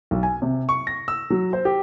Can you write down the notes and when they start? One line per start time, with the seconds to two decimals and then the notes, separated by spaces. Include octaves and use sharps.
0.11 B1
0.23 G#5
0.42 C3
0.69 C#6
0.87 A#6
1.08 E6
1.30 F#3
1.53 C5
1.65 G4